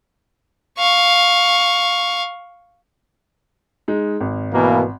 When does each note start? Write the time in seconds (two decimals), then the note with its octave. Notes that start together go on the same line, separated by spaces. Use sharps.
0.78 F5 C#6
3.88 G#3 D#4
4.21 G#1
4.53 B2 E3 A#3